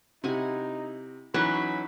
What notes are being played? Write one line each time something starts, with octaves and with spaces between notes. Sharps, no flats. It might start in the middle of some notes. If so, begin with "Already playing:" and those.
C3 D#4 E4 F#5 G#5
E3 F#3 C#4 D#4 F#4 B5